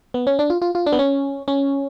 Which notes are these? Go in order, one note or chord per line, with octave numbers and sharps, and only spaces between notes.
B3
C#4
D4
F4
F4
F4
D4
B3
C#4
C#4